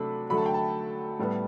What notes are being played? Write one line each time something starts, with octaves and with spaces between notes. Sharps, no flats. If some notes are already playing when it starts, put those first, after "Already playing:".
Already playing: C3 F#3 A3 D4 A5 B5
D3 F#3 A3 B5
A5
G5
A5
A2 G3 B3